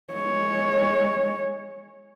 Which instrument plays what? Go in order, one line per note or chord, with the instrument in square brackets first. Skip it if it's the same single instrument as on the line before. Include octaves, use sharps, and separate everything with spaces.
[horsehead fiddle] G#3 C#5